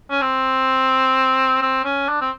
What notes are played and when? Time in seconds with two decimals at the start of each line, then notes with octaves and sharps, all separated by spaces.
0.11 C#4
0.22 C4
1.62 C4
1.85 C#4
2.08 D4
2.21 C4